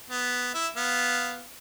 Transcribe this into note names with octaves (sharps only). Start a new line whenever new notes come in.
B3
E4 E5
B3 F5